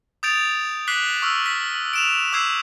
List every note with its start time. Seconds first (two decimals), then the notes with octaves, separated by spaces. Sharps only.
0.23 D#6 G6 A6 D7 F7
0.87 D6 F#6 B6 C7 F#7
1.22 C#6 D6 E6 F6
1.46 F6 B6
1.93 D7 E7 F7
2.32 D6 E6 G6 G#6 C7